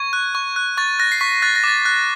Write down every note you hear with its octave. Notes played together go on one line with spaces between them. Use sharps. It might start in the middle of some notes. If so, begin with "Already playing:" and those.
Already playing: C#6 G#6
F#6
C#6
F#6
C#6 A6
F#6 A#6
C7
C#6 B6
F#6 A6
A#6
D6 A6
F#6